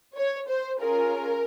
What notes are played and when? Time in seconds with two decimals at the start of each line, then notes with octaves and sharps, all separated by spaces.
0.15 C#5
0.48 C5
0.80 C#4 F4 G#4 A#4